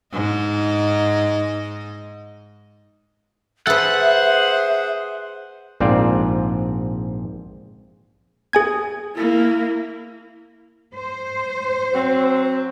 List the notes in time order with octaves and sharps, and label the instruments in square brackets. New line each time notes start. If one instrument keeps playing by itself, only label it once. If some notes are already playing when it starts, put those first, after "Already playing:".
[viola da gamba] G#2 D#5
[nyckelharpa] G#4 C5 [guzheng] A4 B4 [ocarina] E5 [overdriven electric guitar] F#5
[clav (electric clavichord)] A#1 G#2 C4 F4 D5
[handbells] G#4 G#5 G#6
[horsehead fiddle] A#3 E4
[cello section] C5
[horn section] F#3 C4